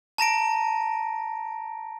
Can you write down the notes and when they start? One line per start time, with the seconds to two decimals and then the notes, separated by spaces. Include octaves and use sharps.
0.18 A5 A#5 A#6 D7